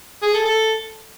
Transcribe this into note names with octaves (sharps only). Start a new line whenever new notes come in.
G#4
A4
A4